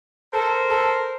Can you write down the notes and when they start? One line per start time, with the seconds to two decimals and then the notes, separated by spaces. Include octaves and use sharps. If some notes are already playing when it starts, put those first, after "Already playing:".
0.34 A4 A#4 C5
0.70 A4